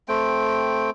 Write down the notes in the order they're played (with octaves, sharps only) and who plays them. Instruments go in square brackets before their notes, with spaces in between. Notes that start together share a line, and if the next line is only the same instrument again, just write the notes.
[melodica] A3 C4 G5